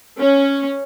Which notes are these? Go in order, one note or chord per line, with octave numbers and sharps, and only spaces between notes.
C#4